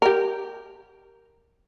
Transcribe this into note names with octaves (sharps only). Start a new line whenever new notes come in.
G4 A#4